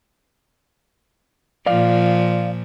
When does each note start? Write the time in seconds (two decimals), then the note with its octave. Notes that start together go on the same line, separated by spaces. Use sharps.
1.66 A#2 F3 D5 F5